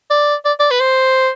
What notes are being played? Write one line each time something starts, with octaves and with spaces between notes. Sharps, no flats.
D5
D5
D5
B4
C5